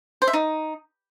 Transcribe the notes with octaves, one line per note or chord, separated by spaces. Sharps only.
C5
E5
D#4